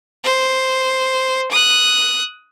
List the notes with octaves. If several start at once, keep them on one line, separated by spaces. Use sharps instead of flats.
C5
D#6 F#6